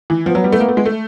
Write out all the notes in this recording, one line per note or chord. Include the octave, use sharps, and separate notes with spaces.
E3
F3 B3
F#3
G3
A3
A#3
A3
G#3
A3